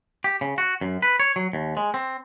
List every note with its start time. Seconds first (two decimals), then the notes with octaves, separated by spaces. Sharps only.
0.24 G4
0.41 C#3
0.58 F#4
0.81 F#2
1.02 B4
1.20 C#5
1.36 F#3
1.53 D#2
1.77 G#3
1.94 C4